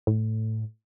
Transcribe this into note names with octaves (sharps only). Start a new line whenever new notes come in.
A2